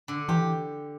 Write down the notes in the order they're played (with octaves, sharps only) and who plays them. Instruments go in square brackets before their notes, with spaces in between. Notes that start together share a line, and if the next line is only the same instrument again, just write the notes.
[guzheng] D3
[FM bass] E3 [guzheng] G4